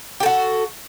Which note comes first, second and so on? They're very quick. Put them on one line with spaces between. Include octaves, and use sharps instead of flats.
G4 A4 F#4